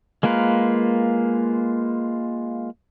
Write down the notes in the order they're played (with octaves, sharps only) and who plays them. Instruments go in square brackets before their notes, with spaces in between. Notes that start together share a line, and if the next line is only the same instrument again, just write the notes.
[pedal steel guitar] G#3 A#3 F4 A#4 B4